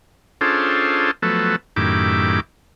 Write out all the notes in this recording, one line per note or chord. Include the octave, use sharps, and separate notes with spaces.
C#4 D4 F4 G#4 A4 C5
F3 F#3 A3 B3 A4
F#2 A2 D#3 E4 G4 D6